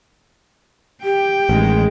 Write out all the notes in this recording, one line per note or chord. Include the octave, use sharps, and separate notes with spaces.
G4 G5
A1 D#3 G#3